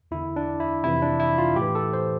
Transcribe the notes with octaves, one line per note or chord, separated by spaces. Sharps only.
E2 D3 E4
D4
E4
F2 C3 E3 E4
D4
E4
F4
A2 G4
E3
A4
C5